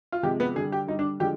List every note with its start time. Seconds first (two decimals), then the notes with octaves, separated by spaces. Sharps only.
0.12 F4
0.23 C3 F3 G#3 G4
0.40 B3
0.55 D3 G#4
0.60 G3
0.72 G4
0.87 D3 G3 D#4
0.99 D4
1.20 D3 F3 G#3 G4